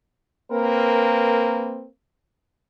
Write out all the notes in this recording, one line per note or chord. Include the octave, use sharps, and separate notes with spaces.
A#3 C4 A#4 B4